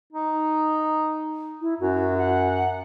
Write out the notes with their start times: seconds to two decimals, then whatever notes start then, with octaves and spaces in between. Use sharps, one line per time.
0.13 D#4
1.61 E4
1.80 F#2 F#4
2.18 F#5